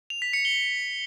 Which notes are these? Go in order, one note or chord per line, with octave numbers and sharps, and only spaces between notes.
F7
B6
C#7
G7